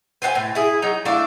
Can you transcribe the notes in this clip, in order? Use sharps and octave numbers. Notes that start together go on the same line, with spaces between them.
B4 C5 F#5 G#5
A2
E4 G#4
F#3 D#4 A#5
A3 D4 E4 F5